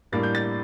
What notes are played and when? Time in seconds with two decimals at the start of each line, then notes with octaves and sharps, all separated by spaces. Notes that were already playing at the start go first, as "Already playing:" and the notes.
0.12 A2 G3 A#3 D4 A6
0.23 G6
0.35 A6